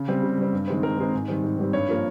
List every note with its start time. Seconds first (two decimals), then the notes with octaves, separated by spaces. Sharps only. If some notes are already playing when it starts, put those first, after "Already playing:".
Already playing: C#3
0.08 G3 C4
0.23 C#3
0.38 G3 C4
0.53 G2
0.68 D#3 G#3 C4
0.83 G2 A#4
0.98 D#3 G#3 C4
1.14 G#2
1.28 D#3 G3 C4
1.43 G#2
1.59 D#3 G3 C4
1.73 G2 C#5
1.89 F3 A#3